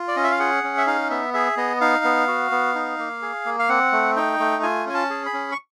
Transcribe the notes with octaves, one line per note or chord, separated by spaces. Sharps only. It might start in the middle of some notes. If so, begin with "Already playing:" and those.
Already playing: F4
D5
C#4 D#5
E5
F5
G#4 F#5
C#4
E5
D#4 F5
B3 E5
G#4 E5
B3 D#5
D#4 F5
B3
F#4
B3
D#4
A#3
G#4
A#3
F5
C4 F#5
A3
D#4 G5
A3
F4 G#5
C#4 G#5
A5
G#4
B5
C#4
C#6